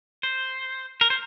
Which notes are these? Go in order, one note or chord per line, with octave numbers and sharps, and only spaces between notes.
C5
A#4
C5